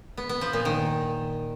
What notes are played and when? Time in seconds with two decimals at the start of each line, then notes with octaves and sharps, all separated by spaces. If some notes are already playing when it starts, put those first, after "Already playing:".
0.17 B3
0.29 B3
0.41 F3
0.53 A#2
0.65 D#3